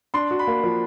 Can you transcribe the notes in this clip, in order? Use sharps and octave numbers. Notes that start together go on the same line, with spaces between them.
D4 C6
F#4
B5
A#3
F3